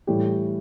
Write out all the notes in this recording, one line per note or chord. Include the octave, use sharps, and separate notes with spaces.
A2 E3 G3 G4